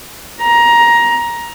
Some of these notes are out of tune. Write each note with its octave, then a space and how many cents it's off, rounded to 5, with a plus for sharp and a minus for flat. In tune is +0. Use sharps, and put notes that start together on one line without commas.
A#5 +15